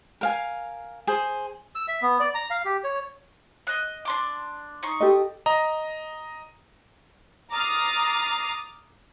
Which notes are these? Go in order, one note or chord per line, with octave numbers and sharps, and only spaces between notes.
A#4 F5 G#5
G#4 C5
E6
E5
B3
D5
A#5
F5
G4
C#5
D#5 F#6
D4 C6 D6
D#4 C6 C#6
G4 A4 D#5
D#5 A#5
A#5 D6 D#6 F6 A6 C7